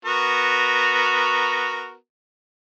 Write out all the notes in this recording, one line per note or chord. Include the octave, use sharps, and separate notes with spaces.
B3 F#4 A#4